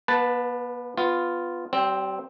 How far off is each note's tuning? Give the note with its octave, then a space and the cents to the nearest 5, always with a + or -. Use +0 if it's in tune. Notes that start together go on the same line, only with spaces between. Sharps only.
B3 -45 B4 +0 A5 +0
B3 +15 F4 +0
G3 -40 C4 +0